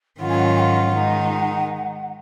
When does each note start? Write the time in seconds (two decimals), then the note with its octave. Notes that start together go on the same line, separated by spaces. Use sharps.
0.20 G#2 D#3 F#3 C#4 F4 F#5
0.29 G#5
0.38 F#5
0.47 F5
0.56 G#5
0.59 F#5
0.93 D#3 G#3 D#4